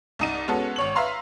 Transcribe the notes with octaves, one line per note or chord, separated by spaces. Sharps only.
C2 D#4 D#7
G#3 B3 C#4 F#4 A4
G#1 C#5 F#7
B4 E5 F5 A#5 C6